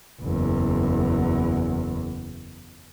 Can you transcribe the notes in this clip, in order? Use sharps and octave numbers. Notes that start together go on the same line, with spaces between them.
F#1 E2